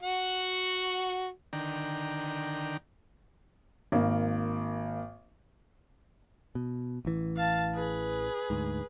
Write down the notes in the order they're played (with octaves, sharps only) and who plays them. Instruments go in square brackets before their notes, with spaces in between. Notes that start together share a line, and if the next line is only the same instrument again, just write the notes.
[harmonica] F#4 F#5
[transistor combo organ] D3 D#3 D4 G5 A#5
[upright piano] G#1 A#3
[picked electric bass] B2
A1 E3
[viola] F5 A5
G#4 B4
[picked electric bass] D2 G#2